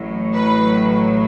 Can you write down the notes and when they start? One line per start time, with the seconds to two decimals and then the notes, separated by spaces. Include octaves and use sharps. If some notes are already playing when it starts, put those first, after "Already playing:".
Already playing: A1 A2 F#3
0.33 B4